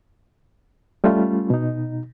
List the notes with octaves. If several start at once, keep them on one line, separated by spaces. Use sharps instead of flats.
G3 A3 C#4 F4
B2 D#4